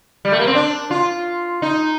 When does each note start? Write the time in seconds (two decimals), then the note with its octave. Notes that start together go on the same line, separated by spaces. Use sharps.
0.25 G3
0.32 A3
0.40 A#3
0.47 C4
0.55 D4
0.91 F4
1.62 D#4